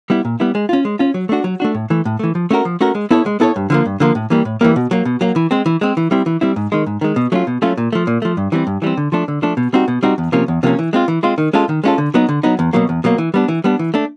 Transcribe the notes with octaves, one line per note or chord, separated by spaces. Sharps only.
G3 B3 E4
A#2
G3 B3 E4
G#3
C#4 F4
G#3
C#4 F4
F#3
A3 D4 F#4
F#3
A3 D4 F#4
A2
E3 A3
A2
E3 A3
F3
A3 C#4 F#4 A#4
F3
A3 C#4 F#4 A#4
G#3
B3 E4 A4 C#5
G#3
B3 E4 A4 C#5
G2
D3 F3 A#3
G2
D3 F3 A#3
A2
E3 G3 A#3
A2
E3 G3 A#3
B2
F#3 A#3
B2
F#3 A#3
E3
G#3 C4
E3
G#3 C4
E3
G3 C4 E4
E3
G3 C4 E4
G#2
D#3 G#3
G#2
D#3 G#3
B2
F#3 A3 C#4 F4
B2
F#3 A3 C#4 F4
A#2
F3 A3
A#2
F3 A3
G2
E3 G3 C4
G2
E3 G3 C4
D3
F3 A3 D4
D3
F3 A3 D4
B2
G3 C4 D#4 F#4
B2
G3 C4 D#4 F#4
E2
C3 F3 A#3 C#4
E2
C3 F3 A#3 C#4
E3
G#3 C4 F4
E3
G#3 C4 F4
D#3
G#3 C#4 F4 A4
D#3
G#3 C#4 F4 A4
D3
F#3 B3 D#4
D3
F#3 B3 D#4
E2
B2 F#3 A#3
E2
B2 F#3 A#3
E3
G3 B3 D4
E3
G3 B3 D4
E3
A3 D4